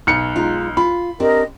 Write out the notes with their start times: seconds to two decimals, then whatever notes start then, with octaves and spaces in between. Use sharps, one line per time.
0.07 B1 C#7
0.36 G#3 D#4 F4
0.77 F4 B5
1.20 C4 D4 G4 A#4 D#5